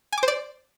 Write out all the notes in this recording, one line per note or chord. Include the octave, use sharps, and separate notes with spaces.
G#5
D6
C5
D5